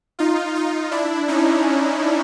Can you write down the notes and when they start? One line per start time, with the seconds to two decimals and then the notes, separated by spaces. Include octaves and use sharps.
0.19 D#4 F4
0.55 D#4 F4
0.91 D4 E4
1.28 C#4 D#4